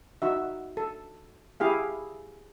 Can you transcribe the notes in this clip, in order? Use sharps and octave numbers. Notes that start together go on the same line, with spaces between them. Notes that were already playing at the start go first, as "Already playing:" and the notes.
D#4 F#4 E5
A4
E4 G4 G#4 F5